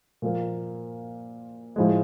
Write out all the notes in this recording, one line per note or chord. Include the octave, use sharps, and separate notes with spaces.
A#2 F3 A#3
A2 F3 G#3